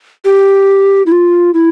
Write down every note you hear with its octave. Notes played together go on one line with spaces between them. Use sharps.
G4
E4
F4
E4